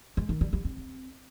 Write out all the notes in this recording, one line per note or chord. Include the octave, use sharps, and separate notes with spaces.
G#3
D#3
G3
G3
C4